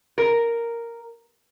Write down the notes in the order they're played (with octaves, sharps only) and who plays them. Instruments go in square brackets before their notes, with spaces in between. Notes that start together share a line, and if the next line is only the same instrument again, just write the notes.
[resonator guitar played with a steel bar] A#4